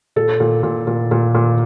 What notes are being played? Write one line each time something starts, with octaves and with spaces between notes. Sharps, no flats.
A#2 A4
A#2
A#2
A#2
A#2
A#2